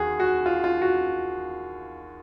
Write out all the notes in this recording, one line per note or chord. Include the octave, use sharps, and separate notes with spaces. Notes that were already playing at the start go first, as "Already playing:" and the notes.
Already playing: D#2 F#4 G#4
F#4
F4
F4
F#4